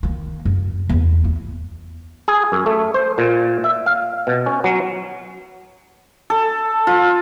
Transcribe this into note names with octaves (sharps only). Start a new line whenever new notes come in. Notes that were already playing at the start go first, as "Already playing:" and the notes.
D#3 A#3
F#2
E2
E4
G#4
F#2
A3
C5
A#2
E5
F5
B2
C#4
F#3
A4
F4